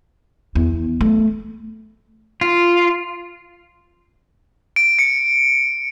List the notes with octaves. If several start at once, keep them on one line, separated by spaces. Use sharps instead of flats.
E2
A3
F4
D7
C#7